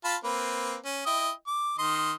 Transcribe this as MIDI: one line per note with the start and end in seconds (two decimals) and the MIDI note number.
0.04 0.16 65
0.04 0.16 81
0.04 0.16 83
0.24 0.76 58
0.24 0.76 60
0.24 0.76 71
0.85 1.03 61
1.06 1.31 64
1.06 1.31 75
1.06 1.31 79
1.47 1.74 86
1.78 2.12 51
1.78 2.12 75
1.78 2.12 84